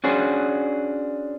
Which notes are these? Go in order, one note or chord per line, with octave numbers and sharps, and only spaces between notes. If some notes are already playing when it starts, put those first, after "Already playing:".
C#4 D4 F#4 G#4 C5